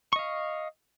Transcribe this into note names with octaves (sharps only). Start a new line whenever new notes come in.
D#5 F5 C#6